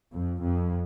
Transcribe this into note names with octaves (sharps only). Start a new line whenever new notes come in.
F2
F2